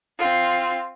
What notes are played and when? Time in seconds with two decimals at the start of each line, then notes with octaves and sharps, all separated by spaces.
0.19 C4 F4